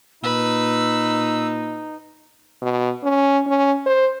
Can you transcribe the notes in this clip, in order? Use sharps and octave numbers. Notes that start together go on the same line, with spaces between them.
A#2 D#4 B4 E6
B2
C#4
C#4
C5